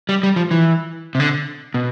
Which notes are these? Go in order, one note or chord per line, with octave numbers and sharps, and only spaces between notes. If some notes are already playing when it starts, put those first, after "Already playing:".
G3
G3
F3
E3
C3
D3
B2